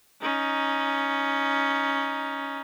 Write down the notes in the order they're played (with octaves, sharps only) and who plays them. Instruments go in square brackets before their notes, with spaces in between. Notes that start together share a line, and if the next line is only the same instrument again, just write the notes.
[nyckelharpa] C#4 D#4